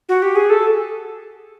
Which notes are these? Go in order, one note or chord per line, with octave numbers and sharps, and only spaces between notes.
F#4
G4
G#4
A4